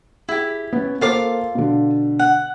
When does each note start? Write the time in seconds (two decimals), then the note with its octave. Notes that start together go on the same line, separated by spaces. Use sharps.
0.29 E4 G4 G#4
0.73 B3 C#4
1.01 A#3 F4 A4 C5 F5 D6
1.55 B2 D3
2.19 F#5